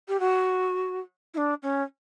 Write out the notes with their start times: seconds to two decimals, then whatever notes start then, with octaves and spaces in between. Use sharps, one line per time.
0.08 G4
0.20 F#4
1.34 E4
1.37 D4
1.63 C#4